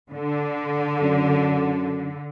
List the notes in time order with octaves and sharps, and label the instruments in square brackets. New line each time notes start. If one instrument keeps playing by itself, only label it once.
[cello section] D3
[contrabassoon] F#2